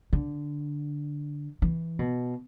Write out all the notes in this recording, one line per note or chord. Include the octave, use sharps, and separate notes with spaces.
D3
E3
B2